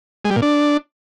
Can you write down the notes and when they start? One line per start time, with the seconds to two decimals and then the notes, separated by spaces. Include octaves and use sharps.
0.25 G#3
0.30 G3
0.36 A#2
0.42 D4